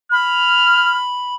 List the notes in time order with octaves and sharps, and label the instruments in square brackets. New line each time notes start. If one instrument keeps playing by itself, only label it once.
[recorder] B5 [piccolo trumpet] F6